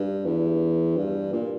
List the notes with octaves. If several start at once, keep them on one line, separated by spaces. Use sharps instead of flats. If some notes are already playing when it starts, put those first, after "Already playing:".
Already playing: G2
E2
G2
A#2